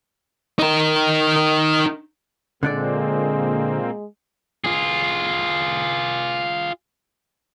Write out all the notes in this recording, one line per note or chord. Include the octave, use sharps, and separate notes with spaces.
D#4 A#4
A#2 D3 G#3 A#3 C4 D4 D5
F4 G#4